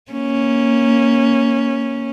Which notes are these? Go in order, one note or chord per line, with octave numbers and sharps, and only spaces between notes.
A#3 C#4